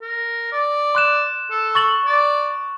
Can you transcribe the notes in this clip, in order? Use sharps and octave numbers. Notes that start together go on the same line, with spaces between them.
A#4
D5
C6 F#6 E7
A4
C#6 A6 F#7
D5